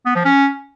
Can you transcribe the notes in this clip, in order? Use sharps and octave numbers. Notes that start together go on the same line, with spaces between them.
B3
F3
C#4